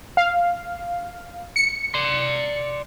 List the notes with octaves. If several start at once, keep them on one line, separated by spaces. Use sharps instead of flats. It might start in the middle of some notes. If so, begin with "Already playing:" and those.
F5
C#7
D5 C6